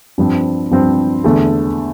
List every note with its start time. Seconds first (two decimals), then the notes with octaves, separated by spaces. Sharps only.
0.18 G2 F3 C4
0.71 G2 F3 C4
1.24 E2 D3 A3